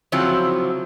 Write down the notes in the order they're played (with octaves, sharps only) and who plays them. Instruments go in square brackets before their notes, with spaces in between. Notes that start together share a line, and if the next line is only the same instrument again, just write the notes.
[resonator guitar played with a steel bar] C#3 F3 F#3 C4 E4